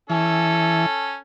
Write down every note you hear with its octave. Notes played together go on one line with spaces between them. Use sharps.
E3 C#4 A4